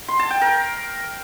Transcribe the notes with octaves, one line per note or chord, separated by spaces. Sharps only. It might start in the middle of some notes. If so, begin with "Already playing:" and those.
C6
A5
G5
A#4